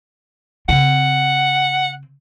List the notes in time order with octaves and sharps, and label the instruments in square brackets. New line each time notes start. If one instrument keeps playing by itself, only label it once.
[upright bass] C#3 C4 [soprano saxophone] F#5